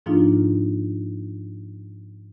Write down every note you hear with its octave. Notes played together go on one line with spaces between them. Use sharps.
G#2 F3 A#3 D4 D#4 F4